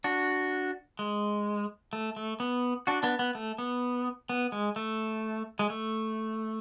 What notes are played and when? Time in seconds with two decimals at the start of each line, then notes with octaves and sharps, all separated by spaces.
0.04 D4 F#4
0.99 G#3
1.93 A3
2.16 A3
2.40 B3
2.87 D4 F#4
3.03 B3 D4
3.19 B3
3.35 A3
3.58 B3
4.29 B3
4.52 G#3
4.76 A3
5.59 G#3
5.70 A3